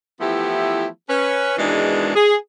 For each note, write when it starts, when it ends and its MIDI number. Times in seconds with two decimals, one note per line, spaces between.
0.20 0.87 52
0.20 0.87 53
0.20 0.87 57
0.20 0.87 59
0.20 0.87 64
0.20 0.87 67
1.09 1.54 61
1.09 1.54 71
1.57 2.16 44
1.57 2.16 47
1.57 2.16 51
1.57 2.16 52
1.57 2.16 56
1.57 2.16 62
2.16 2.34 68